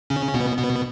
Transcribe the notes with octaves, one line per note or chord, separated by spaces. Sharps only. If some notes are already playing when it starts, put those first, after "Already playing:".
C#3 C#4
B2 B3
B2 B3